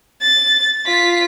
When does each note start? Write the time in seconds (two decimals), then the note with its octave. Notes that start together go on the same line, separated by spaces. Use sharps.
0.21 A6
0.87 F4 B6